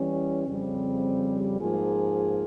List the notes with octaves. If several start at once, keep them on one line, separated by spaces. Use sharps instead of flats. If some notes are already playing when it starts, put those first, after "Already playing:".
Already playing: E3 G3 C#4
F2 C#3 G3 C4
G#2 F3 A#3 F4 G#4